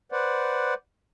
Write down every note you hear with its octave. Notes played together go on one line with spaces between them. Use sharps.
B4 C5 D5 F#5